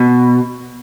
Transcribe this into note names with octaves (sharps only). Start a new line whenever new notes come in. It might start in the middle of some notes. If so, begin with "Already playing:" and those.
Already playing: B2